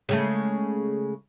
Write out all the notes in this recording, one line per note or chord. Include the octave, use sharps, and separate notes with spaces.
C#3 G#3 A3